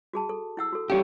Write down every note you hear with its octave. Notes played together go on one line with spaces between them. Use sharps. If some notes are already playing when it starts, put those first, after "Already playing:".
F#4 G#4 A5
A4
E4 F#5 E6
F#4 A4
G3 C#4 G4 F5